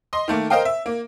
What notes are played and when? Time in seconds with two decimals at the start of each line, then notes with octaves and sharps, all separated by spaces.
0.13 D#5 C6
0.28 D#3 A3 A#3
0.50 A#4 C5 D#5 F5 G5
0.65 E5
0.86 A#3